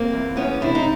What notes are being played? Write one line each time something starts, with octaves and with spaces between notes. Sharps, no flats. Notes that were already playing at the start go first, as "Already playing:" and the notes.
Already playing: A#3 C4
E2
E2 B3 C#4
C3 D4 E4
D#4